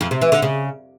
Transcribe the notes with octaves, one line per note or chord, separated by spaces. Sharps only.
F2
C3
E3
D3
C#3